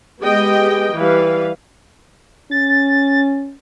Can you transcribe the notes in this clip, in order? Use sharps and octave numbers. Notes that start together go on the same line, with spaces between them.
G#3 B3 G4 D#5 G5
E3 G3 B4 F5
C#4 A6